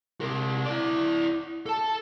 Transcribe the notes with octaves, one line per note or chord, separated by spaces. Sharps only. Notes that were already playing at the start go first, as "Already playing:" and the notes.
C3 A#4
E4 D5
A4 A5